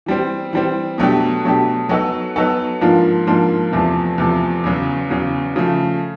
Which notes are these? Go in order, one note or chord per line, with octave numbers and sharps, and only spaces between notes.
E3 G3 C4
E3 G3 C4
B2 F#3 A3 D4 G4
B2 F#3 A3 D4 G4
F#3 B3 D#4 F#4 A4
F#3 B3 D#4 F#4 A4
G#2 F3 A#3 D4 F4
G#2 F3 A#3 D4 F4
E2 C3 F3 A3
E2 C3 F3 A3
E2 C#3 F#3
E2 C#3 F#3
C#3 F3 A3